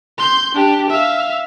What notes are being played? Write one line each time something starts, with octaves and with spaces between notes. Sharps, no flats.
C6 G6
D4 G4
E5 F5